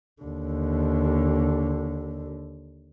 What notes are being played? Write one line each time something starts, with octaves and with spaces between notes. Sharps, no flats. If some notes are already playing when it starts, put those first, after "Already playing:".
D#2 D3